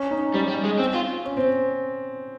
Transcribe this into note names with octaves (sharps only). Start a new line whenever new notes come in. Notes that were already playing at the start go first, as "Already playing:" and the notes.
Already playing: C#4
D#4
G3 C#4
G3
G#3
C4
F4
C#4
C4